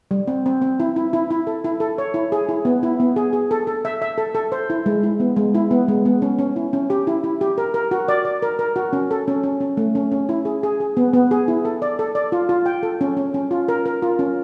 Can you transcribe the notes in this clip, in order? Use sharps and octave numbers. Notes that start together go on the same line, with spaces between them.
G3
C4
C4
C4
E4
E4
E4
E4
A4
E4
A4
C#5
E4
G#4
E4
B3
E4
B3
G#4
G#4
A4
A4
E5
E5
A4
A4
C5
E4
G#3
E4
B3
G#3
E4
B3
G#3
B3
C#4
C#4
E4
C#4
G4
E4
E4
G4
A#4
A#4
F#4
D5
D5
A#4
A#4
F#4
C#4
A4
C#4
C#4
C#4
A3
C#4
C#4
E4
G#4
G#4
G#4
B3
B3
G#4
E4
A4
D5
A4
D5
F4
F4
G5
A4
C#4
C#4
C#4
F4
A#4
A#4
F4
C#4